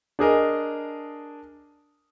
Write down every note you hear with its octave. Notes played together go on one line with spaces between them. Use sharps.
D4 G#4 A#4 D#5